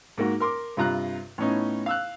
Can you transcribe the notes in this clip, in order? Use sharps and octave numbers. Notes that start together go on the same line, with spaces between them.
G#2 A#3 F#4
A#4 C6 D6
G2 C3 F4 A#5 F#6
A2 B3 C#4 D#4
F5 E6 F#6